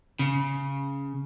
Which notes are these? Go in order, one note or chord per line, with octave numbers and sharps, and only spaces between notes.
C#3